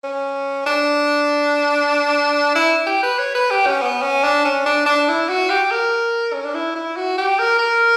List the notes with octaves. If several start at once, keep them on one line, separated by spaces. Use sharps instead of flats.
C#4
D4
E4
G4
B4
C#5
B4
G4
C#4
B3
C#4
D4
C#4
D4
D4
E4
F#4
G4
A#4
C#4
D4
E4
E4
F#4
G4
A#4
A#4